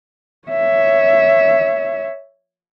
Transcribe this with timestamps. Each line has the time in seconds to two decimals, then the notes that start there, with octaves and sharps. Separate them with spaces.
0.48 C#5 E5